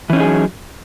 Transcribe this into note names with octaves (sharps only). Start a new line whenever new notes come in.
E3 F#3 C#4 D#4 G#4